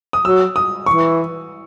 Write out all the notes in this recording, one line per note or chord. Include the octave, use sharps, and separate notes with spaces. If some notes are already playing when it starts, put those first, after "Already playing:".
D#6
F#3 E6
D#6
E3 C#6